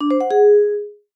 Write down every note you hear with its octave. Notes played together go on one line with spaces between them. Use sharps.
D4
C5
F#5
G#4